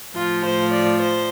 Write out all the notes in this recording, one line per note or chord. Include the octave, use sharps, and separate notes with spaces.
A2 F3 F4
C5
D5
C5